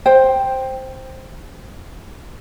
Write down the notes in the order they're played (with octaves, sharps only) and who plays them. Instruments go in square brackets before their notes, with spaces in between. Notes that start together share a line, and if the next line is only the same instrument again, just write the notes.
[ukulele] C5 G5